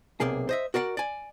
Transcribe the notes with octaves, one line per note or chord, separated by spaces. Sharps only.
B1 C3 A#3 G#4
C5 D#5 E5
F#4 A#4 D5 F5 F#5
D5 G#5